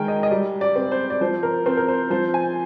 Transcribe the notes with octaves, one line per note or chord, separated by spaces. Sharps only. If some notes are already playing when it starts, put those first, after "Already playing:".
Already playing: D#3 G#3 A#4 G5 G#5
D#5
D#5
G3 D5
D5
C4
C5
D5
F3 C5
A#4
C4 C5
A#4
C5
F3 C5
G#5